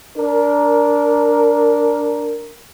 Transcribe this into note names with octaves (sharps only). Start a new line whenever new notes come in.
D4 A#4